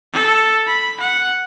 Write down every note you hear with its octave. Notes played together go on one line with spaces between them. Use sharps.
A4
B5
F#5